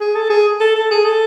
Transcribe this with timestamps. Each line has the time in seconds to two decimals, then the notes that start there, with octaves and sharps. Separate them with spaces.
0.01 G#4
0.16 A4
0.30 G#4
0.60 A4
0.75 A4
0.91 G#4
1.05 A4